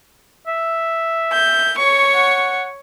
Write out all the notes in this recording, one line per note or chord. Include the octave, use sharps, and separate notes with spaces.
E5
G6
C#5 C#6
F#5